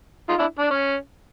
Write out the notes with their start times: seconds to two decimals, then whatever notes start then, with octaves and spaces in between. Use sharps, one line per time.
0.29 D#4 F4
0.39 D4 E4
0.59 D4
0.70 C#4